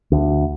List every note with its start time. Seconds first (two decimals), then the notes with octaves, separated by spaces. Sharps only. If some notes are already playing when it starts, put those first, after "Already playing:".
0.12 D2